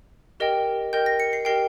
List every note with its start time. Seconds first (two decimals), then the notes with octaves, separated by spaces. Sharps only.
0.40 G4 A#4 D#5 G5
0.93 G4 A#4 D#5 G5 G6
1.06 A#6
1.20 C#7
1.33 C7
1.45 G4 A#4 D#5 G5 C7